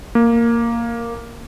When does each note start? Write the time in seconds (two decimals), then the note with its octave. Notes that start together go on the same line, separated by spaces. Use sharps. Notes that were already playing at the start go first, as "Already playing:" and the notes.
0.15 A#3